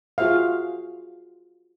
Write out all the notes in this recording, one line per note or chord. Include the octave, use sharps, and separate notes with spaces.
F4 F#4 G#4 C5 E5 F5